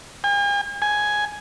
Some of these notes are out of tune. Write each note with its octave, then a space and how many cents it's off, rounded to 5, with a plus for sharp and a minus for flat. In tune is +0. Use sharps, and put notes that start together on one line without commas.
G#5 -45
G#5 +5